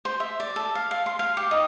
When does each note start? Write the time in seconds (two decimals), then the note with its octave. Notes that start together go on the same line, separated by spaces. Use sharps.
0.05 C5
0.20 E5
0.40 D5
0.56 A4
0.75 F5
0.91 F5
1.06 C6
1.19 F5
1.37 G4
1.51 D#4